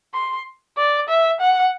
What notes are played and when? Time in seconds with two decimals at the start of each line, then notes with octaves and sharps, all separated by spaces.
0.14 C6
0.77 D5
1.09 E5
1.40 F#5